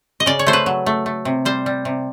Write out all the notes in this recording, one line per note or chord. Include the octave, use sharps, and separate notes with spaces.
D#5
C#3 D5
C#5
A3 C5
B4
F#3
A3
A3
C3
G3 C5
G3
C3